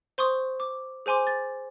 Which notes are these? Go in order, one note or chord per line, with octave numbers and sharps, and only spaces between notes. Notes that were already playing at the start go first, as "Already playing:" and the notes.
C5 C6 C#6 D#6
D6
G#4 C5 G#5 C6 D6
A6